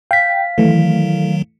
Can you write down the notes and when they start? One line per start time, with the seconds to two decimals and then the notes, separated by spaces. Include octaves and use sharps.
0.11 F5 G5 B6
0.58 D#3 E3 F#3 A3